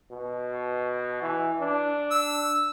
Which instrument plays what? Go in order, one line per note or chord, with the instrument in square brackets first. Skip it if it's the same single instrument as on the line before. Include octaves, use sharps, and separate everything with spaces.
[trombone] B2
E3
D4
[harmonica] E6